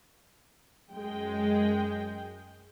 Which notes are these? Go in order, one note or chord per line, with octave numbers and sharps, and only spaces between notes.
F#2 G#3 G5